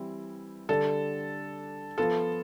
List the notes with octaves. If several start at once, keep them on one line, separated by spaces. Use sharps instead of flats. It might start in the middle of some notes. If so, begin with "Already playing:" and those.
Already playing: E3 G3 C4 E4
D3 G3 D4 A4
F3 B3 F4 A4